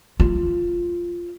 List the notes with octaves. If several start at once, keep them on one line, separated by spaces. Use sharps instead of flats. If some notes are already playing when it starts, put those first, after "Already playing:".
F4